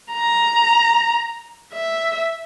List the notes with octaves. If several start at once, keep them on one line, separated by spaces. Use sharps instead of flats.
A#5
E5